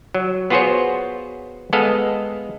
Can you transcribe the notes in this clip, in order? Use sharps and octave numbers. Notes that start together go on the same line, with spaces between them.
F#3
B3 F4 F#4 G#4 C5 C#5
G#3 B3 A4 D#5 F5